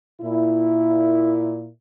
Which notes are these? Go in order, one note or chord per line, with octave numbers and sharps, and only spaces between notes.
A#2 E4